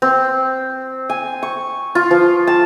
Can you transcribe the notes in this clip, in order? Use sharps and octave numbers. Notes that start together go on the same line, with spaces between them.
C4
G#5
C#6
F4
F3
A5